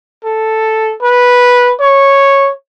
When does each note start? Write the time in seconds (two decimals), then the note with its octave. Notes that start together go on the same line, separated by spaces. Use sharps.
0.25 A4
1.03 B4
1.81 C#5